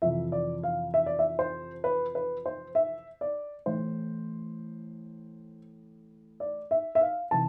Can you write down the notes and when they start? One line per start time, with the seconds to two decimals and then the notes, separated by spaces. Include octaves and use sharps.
0.02 F2 C3 E3 E5
0.32 D5
0.63 F5
0.94 E5
1.06 D5
1.19 E5
1.39 C5
1.84 B4
2.15 B4
2.46 C5
2.75 E5
3.21 D5
3.66 A2 E3 C5
6.40 D5
6.71 E5
6.95 E5
7.01 F5
7.31 C3 E3 A5